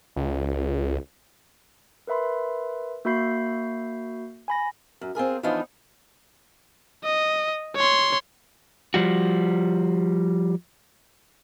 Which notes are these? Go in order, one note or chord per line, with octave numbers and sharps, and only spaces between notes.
C#2
A#4 B4 E5 B5 C6
A#3 F#4 E5 B5 G6 C7
G#5 B5 A#6
F#2
C4 F4 G#4 A#4
E3 F3 B3 D4 D#4 F4
D#5
C#5 C6
F3 G3 F#4